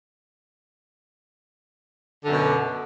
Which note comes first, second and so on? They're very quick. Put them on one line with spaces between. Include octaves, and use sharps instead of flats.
D3 F#2 B2